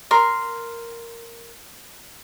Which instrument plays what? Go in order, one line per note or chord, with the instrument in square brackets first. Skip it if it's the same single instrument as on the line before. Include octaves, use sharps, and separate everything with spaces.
[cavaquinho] A#4 C6